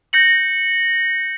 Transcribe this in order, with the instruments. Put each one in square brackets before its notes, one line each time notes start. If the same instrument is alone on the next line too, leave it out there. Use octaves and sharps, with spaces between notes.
[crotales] G6 A#6 C#7 F#7